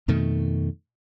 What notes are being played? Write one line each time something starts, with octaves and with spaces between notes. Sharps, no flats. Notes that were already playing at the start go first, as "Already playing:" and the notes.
F2 B2 D#3 A3